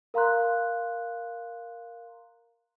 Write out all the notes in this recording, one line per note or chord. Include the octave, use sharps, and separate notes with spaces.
A#4 F5 A#5 C6 F#6